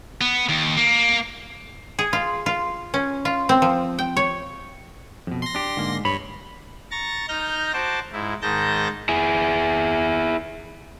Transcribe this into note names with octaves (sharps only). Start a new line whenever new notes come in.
B3
D#2
A#3
G#4
F4
F4
C#4
F4
C4
F3
G5
C#5
F2 B2
C6 A#6
D4 G4
G#2 D3 A#3
G2 C#5 B5
A#5 C#6 A6 A#6
D#4 F6 G6 A#6
F#4 C5 A5 D6
G#2 E4
G#2 D#3 A5 G6 A#6
E4 G#4